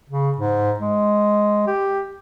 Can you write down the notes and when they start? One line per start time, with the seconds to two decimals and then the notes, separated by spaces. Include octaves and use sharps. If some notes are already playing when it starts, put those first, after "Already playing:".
0.09 C#3
0.38 G#2
0.80 G#3
1.67 G4